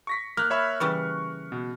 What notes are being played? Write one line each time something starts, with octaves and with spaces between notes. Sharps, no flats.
C#6 A#6 B6
A#3 F6 F#6
C#5 E5 B5
C#3 E3 G3 C#6
B2